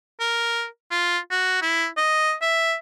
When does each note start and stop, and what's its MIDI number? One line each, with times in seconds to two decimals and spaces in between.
0.20 0.66 70
0.91 1.18 65
1.31 1.62 66
1.62 1.87 64
1.97 2.33 75
2.42 2.74 76